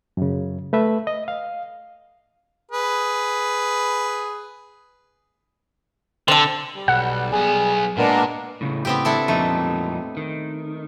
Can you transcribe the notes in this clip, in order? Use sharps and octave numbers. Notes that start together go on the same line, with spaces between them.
F#2 C#3
A3 B4 E5
D#5
F5
G#4 B4
D3 C4 A4
G3
B1 F#5
B1 B3 G#4
A#2 G#3 B3 D4 A#4
A2 C#3
B3 C4 G4
D4 E4 A4
F2 A#2 A3 D#4
D#3